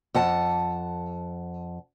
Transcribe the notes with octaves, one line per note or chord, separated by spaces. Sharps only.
F2 F#5 A5